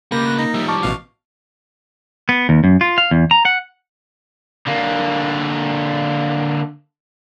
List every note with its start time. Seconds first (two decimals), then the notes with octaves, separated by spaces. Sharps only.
0.12 C#3 A#3 G4 B4 A#6
0.26 F#4
0.38 D#4 A#5
0.54 F3 G3 E5
0.68 A5 C#6 D6 F6
0.83 A1 B2 F5
2.29 B3
2.49 D#2
2.64 F#2
2.81 F4
2.98 F5
3.11 E2
3.31 A#5
3.45 F#5
4.67 D3 A#3